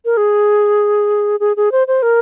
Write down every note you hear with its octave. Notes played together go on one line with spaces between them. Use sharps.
A#4
G#4
G#4
G#4
C5
C5
A#4